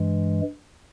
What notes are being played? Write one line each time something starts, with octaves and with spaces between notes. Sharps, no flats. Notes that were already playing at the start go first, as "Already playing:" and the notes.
Already playing: G2 E3 G#3